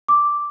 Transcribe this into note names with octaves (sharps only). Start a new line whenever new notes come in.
D6